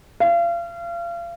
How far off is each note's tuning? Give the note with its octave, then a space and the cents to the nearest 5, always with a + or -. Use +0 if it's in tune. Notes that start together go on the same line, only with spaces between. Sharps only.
F5 -35